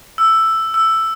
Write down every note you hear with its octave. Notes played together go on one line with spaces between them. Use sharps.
E6
E6